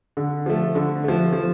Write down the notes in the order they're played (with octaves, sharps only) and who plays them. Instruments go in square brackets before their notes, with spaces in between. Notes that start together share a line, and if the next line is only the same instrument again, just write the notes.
[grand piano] D3
F3 A3
D3
F3 A3
F3